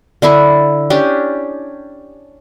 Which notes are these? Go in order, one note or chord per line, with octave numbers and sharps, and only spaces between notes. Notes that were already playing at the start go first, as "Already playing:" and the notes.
D3 D4 E4 E5
C#4 D4 G4